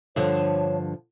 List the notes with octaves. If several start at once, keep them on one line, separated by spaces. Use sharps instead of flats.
G2 D3 F3 C#5